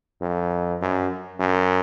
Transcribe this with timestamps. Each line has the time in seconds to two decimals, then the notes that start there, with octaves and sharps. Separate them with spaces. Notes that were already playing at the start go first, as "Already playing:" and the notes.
0.22 F2
0.81 F#2
1.40 F#2